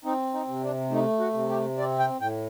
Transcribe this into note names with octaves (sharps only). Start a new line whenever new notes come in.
C4 D#4
D#4
C3
D4
A3 D#4
F#4
C3
G4
C4 D5
G5
A2 G5